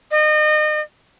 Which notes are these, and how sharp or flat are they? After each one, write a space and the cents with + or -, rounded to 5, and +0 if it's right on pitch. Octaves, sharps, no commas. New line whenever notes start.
D#5 -35